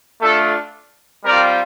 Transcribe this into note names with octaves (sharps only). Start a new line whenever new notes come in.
A3 D4 F4 A4
G3 C4 F4 A#4 D5